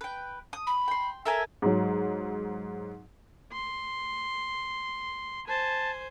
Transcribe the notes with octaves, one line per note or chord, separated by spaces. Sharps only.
B4 G5
D#6
B5
G5 C6
A4 A#4 E5 G#5
G#2 F#3
C6
C5 G#5 A5